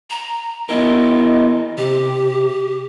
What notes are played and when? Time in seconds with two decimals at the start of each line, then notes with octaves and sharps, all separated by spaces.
0.10 A#5
0.69 B3 E4 A#4 D#5
1.78 C3 G4